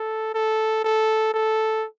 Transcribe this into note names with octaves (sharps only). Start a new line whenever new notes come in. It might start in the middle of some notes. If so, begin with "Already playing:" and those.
Already playing: A4
A4
A4
A4